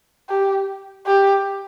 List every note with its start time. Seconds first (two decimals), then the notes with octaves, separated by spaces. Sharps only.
0.29 G4
1.07 G4